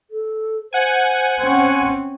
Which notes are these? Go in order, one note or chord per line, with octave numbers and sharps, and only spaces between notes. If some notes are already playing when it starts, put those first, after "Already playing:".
A4
C5 F#5 G#5
C4 C#4